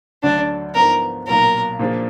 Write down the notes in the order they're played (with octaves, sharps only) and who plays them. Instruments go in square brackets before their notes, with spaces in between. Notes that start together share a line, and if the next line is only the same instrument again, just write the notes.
[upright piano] D2 D3 F#3 [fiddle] D4
[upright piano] G#2 F3 B3 [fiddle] A#4
[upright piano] B1 A#2 F#3 [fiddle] A#4
[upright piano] A#2 F3 A#3 D4 G#4